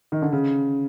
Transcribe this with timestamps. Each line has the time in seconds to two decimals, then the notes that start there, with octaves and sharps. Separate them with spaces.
0.12 D#3
0.22 D3
0.32 C#3